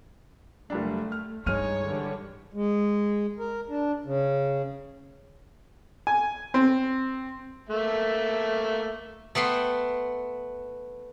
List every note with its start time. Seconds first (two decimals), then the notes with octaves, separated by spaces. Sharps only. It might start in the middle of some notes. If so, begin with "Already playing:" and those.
0.70 F#1 G3 A3 D4
1.12 F6
1.46 G2 G#3 D#4 C#5 F6 D#7
1.85 D3 E3 G3
2.54 G#3
3.39 A#4
3.69 D4
4.05 C#3
6.07 G#5
6.54 C4
7.69 A3 A#3 E5
9.35 A3 B3 G5 C6